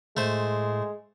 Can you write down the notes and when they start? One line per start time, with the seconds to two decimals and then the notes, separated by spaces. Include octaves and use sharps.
0.17 A2 G#3 A3 C5